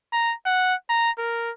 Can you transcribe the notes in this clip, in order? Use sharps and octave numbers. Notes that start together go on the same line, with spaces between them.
A#5
F#5
A#5
A#4